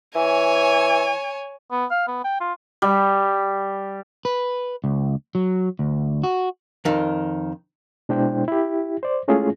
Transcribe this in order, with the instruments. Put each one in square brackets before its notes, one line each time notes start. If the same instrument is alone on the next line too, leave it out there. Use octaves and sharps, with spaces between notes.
[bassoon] E3 [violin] C#5 G#5
[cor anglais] B3
F5
B3
G5
F4
[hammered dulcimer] G3
[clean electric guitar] B4
C#2
F#3
D2
F#4
[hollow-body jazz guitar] F2 D#3
[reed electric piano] B2 G#3 D4 E4 C5 G5
E4 G4
C5 D5
G#3 A3 C#4 E4 F4 G#4